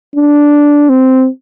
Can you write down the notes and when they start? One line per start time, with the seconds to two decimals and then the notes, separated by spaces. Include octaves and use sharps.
0.16 D4
0.89 C4